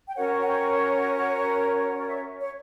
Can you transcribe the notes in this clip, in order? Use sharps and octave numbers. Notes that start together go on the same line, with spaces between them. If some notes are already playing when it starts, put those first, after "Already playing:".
G5
C#4 F#4 A#4 C#5 F#5
F#5
G5
D5
E5
C#5